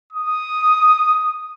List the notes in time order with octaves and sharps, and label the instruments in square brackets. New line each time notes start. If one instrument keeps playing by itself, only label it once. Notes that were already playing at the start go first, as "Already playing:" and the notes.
[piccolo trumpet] D#6